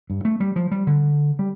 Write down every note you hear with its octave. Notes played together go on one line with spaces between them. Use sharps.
G2
A3
G3
F3
G3
D3
G3